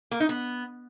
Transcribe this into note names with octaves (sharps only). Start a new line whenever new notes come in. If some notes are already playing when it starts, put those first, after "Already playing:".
A#3
D#4
B3